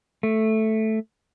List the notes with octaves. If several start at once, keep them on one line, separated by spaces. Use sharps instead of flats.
A3